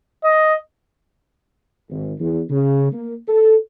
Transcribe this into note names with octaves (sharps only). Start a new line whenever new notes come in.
D#5
G#1
E2
C#3
A#3
A4